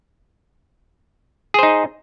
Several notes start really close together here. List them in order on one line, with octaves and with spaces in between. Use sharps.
G#4 C5 D#4